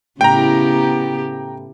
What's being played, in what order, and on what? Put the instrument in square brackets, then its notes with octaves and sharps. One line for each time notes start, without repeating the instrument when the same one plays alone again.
[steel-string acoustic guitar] A2 [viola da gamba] C#3 B3 G4 [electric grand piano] G5 A#5